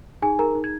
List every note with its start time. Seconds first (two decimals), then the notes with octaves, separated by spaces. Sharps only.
0.22 D#4 G#4 G#5
0.39 G#4 A#4 A#5
0.55 D#4
0.64 G#6